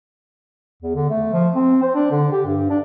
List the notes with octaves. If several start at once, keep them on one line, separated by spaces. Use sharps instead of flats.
E2
D3
A3
F3
C4
C5
D4
D3
G4
G2
D4